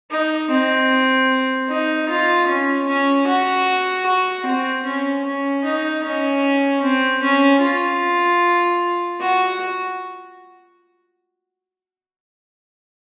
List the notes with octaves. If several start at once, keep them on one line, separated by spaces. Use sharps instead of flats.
D#4
C4
D#4
F4
C#4
C#4
F#4
F#4
C4
C#4
C#4
D#4
C#4
C4
C#4
F4
F#4